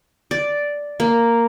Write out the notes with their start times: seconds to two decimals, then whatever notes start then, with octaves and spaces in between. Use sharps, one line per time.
0.31 D5
1.00 A#3